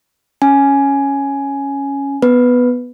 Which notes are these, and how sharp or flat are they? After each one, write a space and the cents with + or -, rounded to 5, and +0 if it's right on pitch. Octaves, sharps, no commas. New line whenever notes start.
C#4 +0 G#5 +10
B3 +0 B4 +0